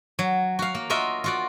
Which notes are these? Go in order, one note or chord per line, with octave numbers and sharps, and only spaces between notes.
F#3
F#4 F5
A#3
F4 F#4 A#4 D#5 E5
F4 F#4 D5